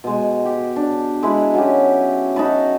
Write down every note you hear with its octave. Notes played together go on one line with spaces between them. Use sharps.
B2 G#3
G4
D4
G#3 E4 B4
F#3 B3 C#4 G4
D#4 F#4 A5 B5